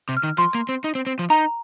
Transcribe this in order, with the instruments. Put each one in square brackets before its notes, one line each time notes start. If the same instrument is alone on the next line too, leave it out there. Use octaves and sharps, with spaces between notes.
[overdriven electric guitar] C3
[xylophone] F6
[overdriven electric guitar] D#3
[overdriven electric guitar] F3 [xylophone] C6
[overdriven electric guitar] A#3
C4
D#4
C4
C4
F3
[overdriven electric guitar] D#4 [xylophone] A#5